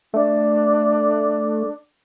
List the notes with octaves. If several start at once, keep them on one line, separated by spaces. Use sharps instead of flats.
A3 D4